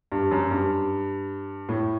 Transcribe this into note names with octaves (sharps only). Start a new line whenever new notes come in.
G2
F#2
G2
A2